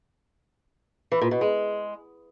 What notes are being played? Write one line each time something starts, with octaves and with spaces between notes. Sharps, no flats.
E3
A#2
B2
G#3